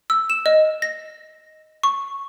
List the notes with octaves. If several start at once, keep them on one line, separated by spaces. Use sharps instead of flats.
E6
E7
D#5
A#6
C#6